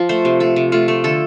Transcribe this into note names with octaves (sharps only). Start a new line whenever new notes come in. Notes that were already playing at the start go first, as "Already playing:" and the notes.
Already playing: F3
A3 C5
C3
A3 A4
C3
A3 F4
A3
D3 A4